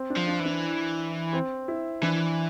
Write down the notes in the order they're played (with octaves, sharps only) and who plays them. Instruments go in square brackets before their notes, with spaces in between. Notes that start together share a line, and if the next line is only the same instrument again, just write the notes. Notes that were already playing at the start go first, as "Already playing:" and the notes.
Already playing: [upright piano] C4
D4
[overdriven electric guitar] F3
[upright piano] D4
[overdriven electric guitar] E3
[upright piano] D4
C4
E4
[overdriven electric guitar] E3 [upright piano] D4